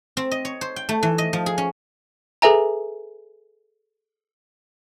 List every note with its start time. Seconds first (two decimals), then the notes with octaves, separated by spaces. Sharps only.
0.17 C4
0.31 D#5
0.45 C#5
0.61 C5
0.76 G5
0.89 A3
1.03 E3
1.18 D#5
1.33 F3
1.46 G#4
1.58 C#4
2.42 G#4 A4 B4 E5 G#5 A#5